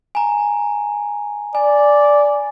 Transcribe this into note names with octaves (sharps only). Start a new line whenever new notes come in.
G#5 A#5
D5 G#5